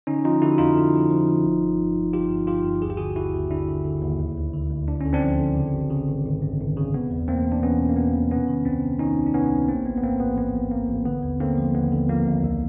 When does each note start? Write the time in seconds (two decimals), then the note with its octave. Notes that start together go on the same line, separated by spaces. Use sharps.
0.07 D3 C#4 D#4
0.24 F3 D#4 F4
0.42 D3 E4 F#4
0.58 F2 D#4 F4
0.76 D3
0.93 F3
1.10 F3
1.27 F3
1.45 G1
1.62 G1
1.79 G1
1.96 G1
2.13 G1 F4 G4
2.30 G2
2.47 G1 F4 G4
2.64 G2
2.82 D#2 G#4
2.90 G4
2.97 D3 F#4 G#4
3.16 D#2 E4 F#4
3.33 D#2
3.51 D3 D4 E4
3.68 D3
3.85 D3
4.02 D#2
4.20 D2
4.37 D2
4.53 D3
4.71 D2
4.88 D2 D4
5.01 D3 C#4
5.13 C4 D4
5.22 F3
5.40 D3
5.57 C#3
5.74 G#1
5.90 C#3
6.08 G#1
6.25 G#1
6.42 F#2
6.60 G#1
6.77 C#3
6.94 B2 B3
7.11 E2
7.28 E2 A#3 C4
7.45 E2
7.52 D4
7.62 E2 B3 C#4
7.80 B2
7.89 A#3
7.96 B2 B3
8.14 E2
8.31 C3 B3 C#4
8.48 D#3
8.65 C#2 C4 D4
8.82 C3
8.99 D#3 C#4 D#4
9.17 C#2
9.27 D4
9.34 C3 B3 C#4
9.52 C#2
9.68 A1 A#3 C4
9.86 A1 B3
9.97 B3
10.03 G#2 A#3 C4
10.20 A1 B3
10.37 A1 B3
10.55 A1
10.71 A1 A#3
10.89 A1
11.05 D3 B3
11.23 D#2
11.40 D3 A#3 C4
11.58 F3
11.74 D#2 B3
11.92 D3
12.09 F3 A#3
12.26 D#2
12.44 C2